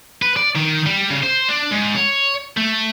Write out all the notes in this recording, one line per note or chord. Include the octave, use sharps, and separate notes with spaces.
B4
D5
D#3
G3
C#3
C5
D4
G#2
C#5
A3